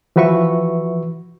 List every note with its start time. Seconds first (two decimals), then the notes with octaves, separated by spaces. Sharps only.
0.16 E3 F3 F#4 B4 E5 C#6